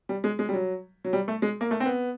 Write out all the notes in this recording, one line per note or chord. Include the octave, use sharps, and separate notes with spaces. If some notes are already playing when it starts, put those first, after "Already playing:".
G3
G#3
G#3
G3
F#3
F#3
G3
A3
G#3
A#3
A3
C4
B3